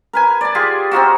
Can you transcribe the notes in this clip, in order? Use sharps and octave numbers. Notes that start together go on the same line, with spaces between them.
A#4 B4 G#5
D5 A5
F4 G4 G#4
C4 D#4 F4 F#4